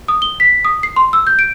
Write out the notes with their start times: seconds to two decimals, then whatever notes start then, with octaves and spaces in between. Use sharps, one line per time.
0.08 D#6
0.22 G7
0.40 B6
0.65 D#6
0.83 C7
0.96 C6
1.13 E6
1.27 G6
1.39 D7